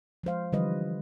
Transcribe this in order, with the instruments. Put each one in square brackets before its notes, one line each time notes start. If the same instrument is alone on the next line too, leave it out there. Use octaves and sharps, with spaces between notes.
[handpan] F3 G#3 C5 F5
D3 E3 F3 G3 B4 D#5